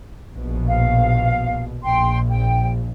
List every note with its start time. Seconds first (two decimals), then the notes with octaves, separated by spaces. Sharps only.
0.34 A#1 B2
0.67 F5
1.83 A#1 G5 C6
2.28 G5